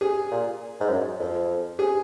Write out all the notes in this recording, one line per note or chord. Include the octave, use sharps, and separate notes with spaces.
G#4
A#2
G#2
F#2
F2
G#4